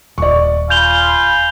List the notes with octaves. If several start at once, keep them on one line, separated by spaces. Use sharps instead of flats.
D#1 D5 C#6
F4 G#5 B5 G6 F7 G7